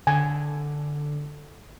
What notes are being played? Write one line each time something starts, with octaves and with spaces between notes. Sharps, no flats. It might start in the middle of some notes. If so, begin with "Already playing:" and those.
D3 G#5